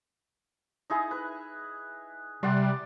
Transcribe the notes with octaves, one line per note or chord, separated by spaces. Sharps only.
D#4 E4 G#4
B4
C3 G3 D5 F#5 C6